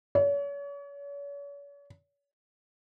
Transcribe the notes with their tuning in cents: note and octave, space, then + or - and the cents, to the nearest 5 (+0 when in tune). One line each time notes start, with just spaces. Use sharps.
C#5 +40